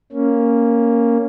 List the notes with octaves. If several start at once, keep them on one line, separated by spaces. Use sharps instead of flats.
A#3 C#4